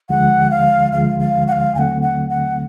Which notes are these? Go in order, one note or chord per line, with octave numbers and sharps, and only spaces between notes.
D2 D3 F3 G#3 F#5
F5
D2 D3 F3 G#3 F5
F5
F#5
F5
D#2 D3 F#3 A3 C4 F#5 G#5
F#5
F#5